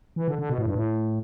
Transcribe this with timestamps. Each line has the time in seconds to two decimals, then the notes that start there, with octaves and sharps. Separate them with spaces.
0.16 E3
0.28 D3
0.39 D3
0.50 B2
0.58 A2
0.66 G2
0.75 A2